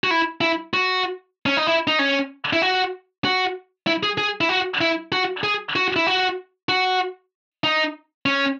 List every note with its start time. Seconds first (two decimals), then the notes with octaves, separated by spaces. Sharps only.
0.04 F#4
0.11 E4
0.41 E4
0.74 F#4
1.46 C#4
1.57 D#4
1.67 E4
1.87 D#4
1.99 C#4
2.53 E4
2.62 F#4
3.25 F#4
3.87 E4
4.03 G#4
4.18 G#4
4.41 E4
4.49 F#4
4.81 E4
5.12 F#4
5.44 G#4
5.76 F#4
5.96 E4
6.07 F#4
6.69 F#4
7.64 D#4
8.26 C#4